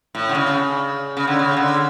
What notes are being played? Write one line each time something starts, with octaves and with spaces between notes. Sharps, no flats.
A2
D3
C#3
C#3
D3
C#3
D3